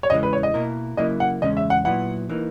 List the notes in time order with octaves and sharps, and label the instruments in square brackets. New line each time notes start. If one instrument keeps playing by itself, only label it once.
[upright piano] C#5
[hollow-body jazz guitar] E2 C#3 E3 G#3 [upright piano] D#5
[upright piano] B4
C#5
D#5
[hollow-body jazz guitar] B2 A#3 E4 A#4
[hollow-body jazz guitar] C#3 F#3 A#3 E4 [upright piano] D#5
[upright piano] F#5
[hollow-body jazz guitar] E2 C#3 G#3 C#4 [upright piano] D#5
[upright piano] E5
F#5
[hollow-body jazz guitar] A#2 F#3 B3 E4 [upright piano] F#5
[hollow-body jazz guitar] E3 A#3 D#4